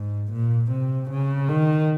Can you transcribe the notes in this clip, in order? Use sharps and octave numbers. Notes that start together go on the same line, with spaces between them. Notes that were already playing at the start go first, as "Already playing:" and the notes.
Already playing: G#2
A#2
C3
C#3
D#3